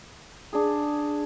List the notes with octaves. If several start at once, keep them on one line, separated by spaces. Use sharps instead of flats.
D4 G#4